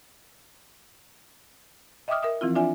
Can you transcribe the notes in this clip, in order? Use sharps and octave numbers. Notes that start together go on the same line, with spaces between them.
D#5 E5 G5 D6 D#6 F6
A#4 E5 D#6
E3 F3 C4 E4 F4
D4 F4 D5 E5 G#5